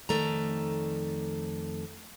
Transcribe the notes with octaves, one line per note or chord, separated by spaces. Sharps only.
F2 D#3 A3 D5 A#5